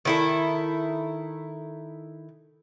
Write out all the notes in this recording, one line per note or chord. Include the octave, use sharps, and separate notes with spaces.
D#3 E4 A4